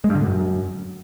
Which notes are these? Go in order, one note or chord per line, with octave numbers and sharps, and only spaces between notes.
G#3
G2
D3
A2
F#2